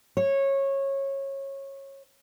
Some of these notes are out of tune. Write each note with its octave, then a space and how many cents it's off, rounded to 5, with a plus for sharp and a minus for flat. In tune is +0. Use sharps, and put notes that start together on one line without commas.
C#5 -20